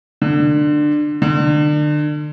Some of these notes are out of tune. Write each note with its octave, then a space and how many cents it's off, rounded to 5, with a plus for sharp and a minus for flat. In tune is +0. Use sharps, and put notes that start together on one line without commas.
D3 +20
D3 +30